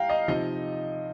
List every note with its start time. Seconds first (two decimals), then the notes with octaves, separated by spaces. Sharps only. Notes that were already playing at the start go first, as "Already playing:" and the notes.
Already playing: G3 F5 G5 A#5
0.09 D#5
0.28 C3 F3 D#4 D#5